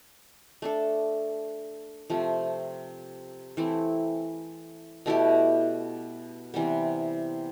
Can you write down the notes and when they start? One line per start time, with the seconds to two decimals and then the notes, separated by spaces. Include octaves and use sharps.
0.62 A3 D4 A4
2.10 C3 F3 A3
3.57 E3 A3 C4 E4
5.06 B2 A3 E4 G4
6.54 C3 E3 G3 B3